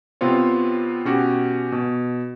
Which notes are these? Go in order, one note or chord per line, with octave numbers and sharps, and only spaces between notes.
C3 B3 C4 F4 C#5
B2 C#4 F#4 G4
B2